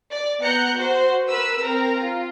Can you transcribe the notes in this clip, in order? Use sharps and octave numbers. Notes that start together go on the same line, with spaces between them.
D5
B3 A#5 F#6 G6 C#7
F#4 C5
A#4 B4 B5 E6
C4 A#4 A#5
F4